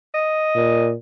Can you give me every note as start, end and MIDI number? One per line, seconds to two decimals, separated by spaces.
0.14 0.88 75
0.56 0.94 46